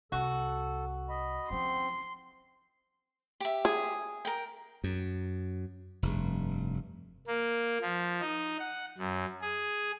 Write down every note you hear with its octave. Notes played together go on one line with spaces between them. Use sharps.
C2 F#4 A4
D#5 B5
F3 C4 C#4 C6
G4 E5
G#4
A#4 G5
F#2
F1 G2
A#3
F3
D#4
F#5
F#2
G#4